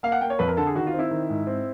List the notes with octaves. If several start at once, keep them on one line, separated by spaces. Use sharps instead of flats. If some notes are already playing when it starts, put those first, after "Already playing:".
A#3 F5
F#5
A#3 G5
C#5
F2 B4
A#4
D3 A4
G#4
D#3 F#4
F4
C4
E4
D#3
G#2
C4